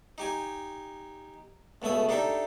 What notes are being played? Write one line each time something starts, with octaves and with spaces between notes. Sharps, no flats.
D#4 G4 G#5
C#2 B2 A3 E5 D#6
D4 D#4 G4 A4 E5